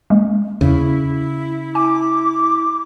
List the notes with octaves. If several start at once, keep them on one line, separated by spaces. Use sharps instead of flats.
G#3 A#3 C#4
E2 C#3 E4
G#5 D6